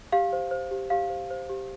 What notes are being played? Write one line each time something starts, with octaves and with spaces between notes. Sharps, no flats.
G4 F5
C5
C5
G4
G4 F5
C5
C5
G4